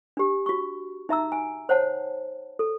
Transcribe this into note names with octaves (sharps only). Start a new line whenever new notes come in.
D4 G4
F#4 C#6
D#4 E5 A#5 E6
G#5
C5 C#5 F#5 A5
A4